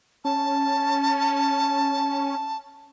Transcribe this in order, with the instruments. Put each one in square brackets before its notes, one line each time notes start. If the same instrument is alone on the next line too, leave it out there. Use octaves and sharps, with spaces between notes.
[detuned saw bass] C#4 [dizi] A5